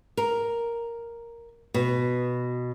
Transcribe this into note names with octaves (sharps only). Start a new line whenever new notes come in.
A#4
B2